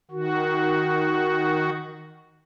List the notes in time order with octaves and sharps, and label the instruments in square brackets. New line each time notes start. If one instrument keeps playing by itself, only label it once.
[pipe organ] D#3 F#4